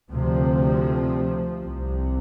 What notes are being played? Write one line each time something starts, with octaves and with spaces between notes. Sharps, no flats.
D2 C3 F3
C2 C3